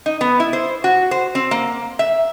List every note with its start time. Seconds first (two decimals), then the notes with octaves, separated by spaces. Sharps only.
0.06 D#4
0.21 B3
0.40 E4
0.53 C5
0.84 F#4
1.11 C5
1.35 C4
1.51 A#3
1.99 E5